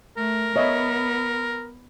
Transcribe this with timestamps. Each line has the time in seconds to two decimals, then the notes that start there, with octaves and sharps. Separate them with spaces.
0.17 A3 A#4
0.56 B3 C#5 D#5 E5